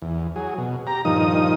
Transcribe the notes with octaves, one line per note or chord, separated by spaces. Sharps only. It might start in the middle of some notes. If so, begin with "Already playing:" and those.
E2
F#3 G#4
B2
G4 A#5
G2 A#2 D#3 F3 D#4 D#6